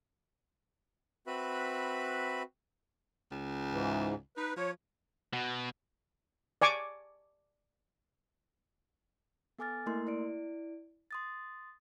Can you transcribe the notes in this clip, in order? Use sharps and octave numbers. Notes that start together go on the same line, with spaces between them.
C4 F#4 B4 E5 B5 F#6
C#2
G#2 E3
D#4 B4
F3 C#5
B2
D5 G#5 C#6 D6
B3 A4 G#5 D6 F6 A6
A3 A#3 E4 A#4 C6
E4 D5 D7
C6 D#6 A6